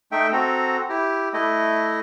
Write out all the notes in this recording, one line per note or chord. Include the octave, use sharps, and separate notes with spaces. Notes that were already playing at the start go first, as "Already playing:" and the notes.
A3 D#4 E5 G5
C4 F#4 A4 A#5
E4 G4
A3 E4 D#5